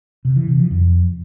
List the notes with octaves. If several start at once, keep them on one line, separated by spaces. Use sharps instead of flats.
C3
E3
C3
F3
F2